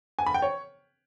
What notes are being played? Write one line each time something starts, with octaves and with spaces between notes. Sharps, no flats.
G#5
B5
G5
C#5